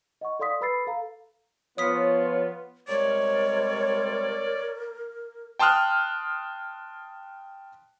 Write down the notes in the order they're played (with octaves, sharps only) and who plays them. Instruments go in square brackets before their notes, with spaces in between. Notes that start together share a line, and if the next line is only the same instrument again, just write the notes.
[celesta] D#5 F#5 C#6
A4 D5 F5 C6 D#6 B6
A4 B4 B5 E6 A6 C7
A4 F5 A#5
[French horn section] F3 C#5 [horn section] B3 F4 [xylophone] D#6 B6
[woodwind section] C3 G3 G#3 [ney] A#4 [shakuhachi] C#5 [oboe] D5
[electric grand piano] G5 A5 C6 D#6 F6 F#6